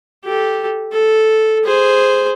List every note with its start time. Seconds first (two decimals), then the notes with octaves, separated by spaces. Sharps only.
0.25 G4 A4
0.92 A4
1.65 G#4 C5